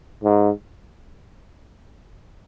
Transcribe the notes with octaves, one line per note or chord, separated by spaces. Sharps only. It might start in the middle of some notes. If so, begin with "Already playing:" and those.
G#2